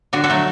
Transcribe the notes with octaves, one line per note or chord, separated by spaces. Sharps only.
D3 D4 F#4
F#4 A4
F#3 A3